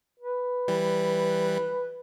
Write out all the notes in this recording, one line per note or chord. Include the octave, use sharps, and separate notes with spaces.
B4
E3 G3